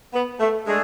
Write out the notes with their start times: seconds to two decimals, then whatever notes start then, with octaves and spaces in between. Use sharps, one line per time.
0.13 B3
0.40 A3
0.66 G#3 A3 D4 G#4